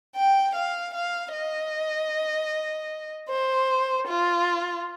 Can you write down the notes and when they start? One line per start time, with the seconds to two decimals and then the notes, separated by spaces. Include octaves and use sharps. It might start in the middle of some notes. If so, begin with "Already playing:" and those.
0.16 G5
0.55 F5
0.94 F5
1.33 D#5
3.29 C5
4.08 F4